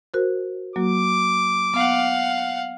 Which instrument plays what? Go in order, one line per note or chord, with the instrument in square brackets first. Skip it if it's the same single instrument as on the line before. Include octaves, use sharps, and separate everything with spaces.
[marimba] F#4 A#4 C5
[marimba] F#3 A#3 F#4 [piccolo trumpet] D6
[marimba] B3 [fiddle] F5 F#5